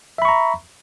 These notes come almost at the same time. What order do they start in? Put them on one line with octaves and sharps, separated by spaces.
E5 B5 C#6 A#5